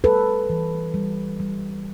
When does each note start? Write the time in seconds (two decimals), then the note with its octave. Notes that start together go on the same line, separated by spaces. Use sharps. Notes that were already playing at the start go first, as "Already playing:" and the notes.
0.04 G3 A4 B4
0.50 E3
0.94 G3
1.40 G3